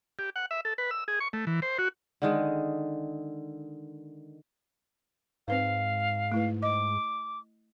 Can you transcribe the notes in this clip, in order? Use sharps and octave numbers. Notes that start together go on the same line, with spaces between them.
G4
F#5
E5
A4
B4
E6
G#4
C#6
A3
E3
C5
F#4
D3 D#3 G#3
G#2 C4 B4 C5 F5
A3 E4 B4
D#5 D6